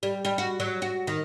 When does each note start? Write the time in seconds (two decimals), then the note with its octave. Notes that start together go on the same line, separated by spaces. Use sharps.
0.03 G3
0.25 G3
0.38 F#4
0.60 F#3
0.82 F#4
1.07 D#3